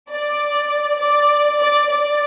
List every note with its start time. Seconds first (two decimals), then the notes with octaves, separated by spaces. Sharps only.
0.10 D5
0.99 D5
1.60 D5
1.90 D5